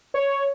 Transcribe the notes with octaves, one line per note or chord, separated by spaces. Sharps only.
C#5